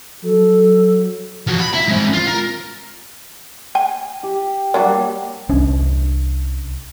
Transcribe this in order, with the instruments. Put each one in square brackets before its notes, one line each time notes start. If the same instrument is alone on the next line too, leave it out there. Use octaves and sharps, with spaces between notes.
[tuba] F#3 [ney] A4
[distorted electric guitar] F3 F#4
B5
E4 E5
G#3 C4
F4
A#4
[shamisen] G5 G#5
[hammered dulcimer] G4
[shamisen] F#3 D4 F#4 [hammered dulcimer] G3 A#3
[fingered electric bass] C2 C#4 D4